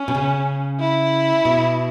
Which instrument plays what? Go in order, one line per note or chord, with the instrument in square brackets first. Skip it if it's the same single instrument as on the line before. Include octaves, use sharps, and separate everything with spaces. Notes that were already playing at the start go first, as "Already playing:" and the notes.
Already playing: [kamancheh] C#4
[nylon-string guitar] B2
C#3
[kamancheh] E4
[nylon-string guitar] B2